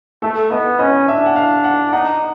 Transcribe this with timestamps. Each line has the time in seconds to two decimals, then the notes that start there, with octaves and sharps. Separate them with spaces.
0.22 A3 A4
0.50 B3 D#5
0.79 C#4 D#5
1.08 D4 E5
1.26 F#5
1.36 F5
1.64 F#5
1.93 D#4 F#5